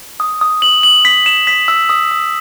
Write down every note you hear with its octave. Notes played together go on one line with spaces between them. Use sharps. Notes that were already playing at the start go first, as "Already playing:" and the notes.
D#6
D#6
F#7
F#7
B6
E7
B6
E6
D#6
D#6